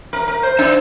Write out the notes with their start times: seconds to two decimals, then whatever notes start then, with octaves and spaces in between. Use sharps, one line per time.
0.13 A#4
0.28 A#4
0.43 C5
0.59 D4